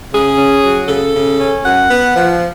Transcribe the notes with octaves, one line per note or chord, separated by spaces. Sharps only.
C#3 G#4
C#4
F#3
C#3 A4
C#3
C#4
F#2 F#5
B3
F3